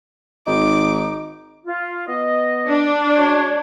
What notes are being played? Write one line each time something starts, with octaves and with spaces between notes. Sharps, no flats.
G#1 D#4 D6
F4
B3 D#5
D4
G#3 F#4 C#5